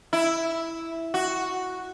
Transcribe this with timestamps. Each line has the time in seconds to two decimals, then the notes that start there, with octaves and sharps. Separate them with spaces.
0.13 E4
1.14 F#4